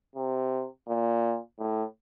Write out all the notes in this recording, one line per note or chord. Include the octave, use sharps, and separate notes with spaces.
C3
A#2
A2